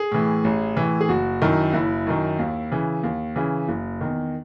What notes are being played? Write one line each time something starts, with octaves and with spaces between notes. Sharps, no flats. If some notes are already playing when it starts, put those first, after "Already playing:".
Already playing: G#4
A2 E3
A1
A2 E3
G#4
F#1 F#4
F#2 D#3 E4
F#1 E4
F#2 D#3
D#2
C#3 E3
D#2
C#3 E3
F#1
E2 D#3